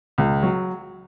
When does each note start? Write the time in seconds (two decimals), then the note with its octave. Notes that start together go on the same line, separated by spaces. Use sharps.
0.18 C#2
0.43 F#3